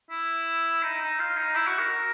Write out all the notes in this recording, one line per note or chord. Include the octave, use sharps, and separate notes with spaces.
E4
D#4
D#4
F4
D#4
E4
F#4
A#4